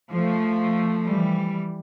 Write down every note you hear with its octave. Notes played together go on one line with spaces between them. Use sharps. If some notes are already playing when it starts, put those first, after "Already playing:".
F3 A3
E3 G3